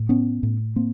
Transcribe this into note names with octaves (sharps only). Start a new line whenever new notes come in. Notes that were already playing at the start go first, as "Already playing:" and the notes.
Already playing: A2
B3 C#4
A2
A#3 C4